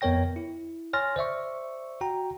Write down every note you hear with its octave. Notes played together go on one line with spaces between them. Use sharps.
F2 B3 A#4 C#5 G5 A#6
E4
C#5 G#5 C6 F6 A6 A#6
C5 D5 E5 C#6
F#4 G5 A#5